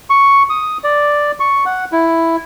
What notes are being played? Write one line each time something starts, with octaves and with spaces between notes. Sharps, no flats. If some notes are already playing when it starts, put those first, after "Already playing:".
C#6
D#6
D5
C#6
F#5
E4